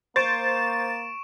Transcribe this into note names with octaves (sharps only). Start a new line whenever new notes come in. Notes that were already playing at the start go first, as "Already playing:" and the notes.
A#3 C5 C#6 A6 D7 E7